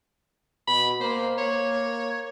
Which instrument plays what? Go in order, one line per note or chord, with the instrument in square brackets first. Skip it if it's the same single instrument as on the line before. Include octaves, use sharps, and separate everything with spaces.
[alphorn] B2 [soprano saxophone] B5
[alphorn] A#3 [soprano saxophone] C5
[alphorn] A#3 [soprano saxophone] C#5